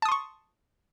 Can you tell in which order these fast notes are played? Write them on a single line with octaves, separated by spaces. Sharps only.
A5 D#6 C6 C#6